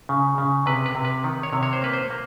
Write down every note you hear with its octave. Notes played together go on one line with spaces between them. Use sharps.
C#3
C#3
C3 B4
B4
C3
B4
D#3
C#5
C3
C#5
C5
A#3 B4
C5
A#3